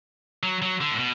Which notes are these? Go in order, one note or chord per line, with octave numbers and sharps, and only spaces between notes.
F#3
F#3
D3
A2
B2